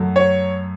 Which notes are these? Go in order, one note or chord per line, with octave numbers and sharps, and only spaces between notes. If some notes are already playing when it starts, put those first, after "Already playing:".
Already playing: F#2 F#3 A3
C#5